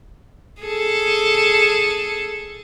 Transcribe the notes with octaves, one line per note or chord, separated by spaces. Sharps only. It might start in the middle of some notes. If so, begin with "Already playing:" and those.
G#4 A4